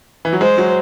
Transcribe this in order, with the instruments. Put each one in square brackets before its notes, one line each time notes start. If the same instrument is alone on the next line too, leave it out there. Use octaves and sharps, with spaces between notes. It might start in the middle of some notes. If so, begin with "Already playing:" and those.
[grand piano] E3
F#3
[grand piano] G#3 [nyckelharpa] C5
[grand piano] F#3